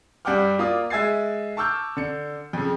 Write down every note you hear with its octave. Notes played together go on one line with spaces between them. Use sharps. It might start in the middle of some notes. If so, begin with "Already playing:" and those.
G2 G3 F#5 G5 D6 F6
A#3 F4 D5 F5 D#6
G#3 E5 G#5 G#6 A6 C7
A5 C#6 D6 E6 F6 G6
D3 C#7
F2 C#3